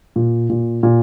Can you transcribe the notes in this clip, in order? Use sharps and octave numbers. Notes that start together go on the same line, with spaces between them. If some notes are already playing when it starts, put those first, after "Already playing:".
A#2
A#2
A#2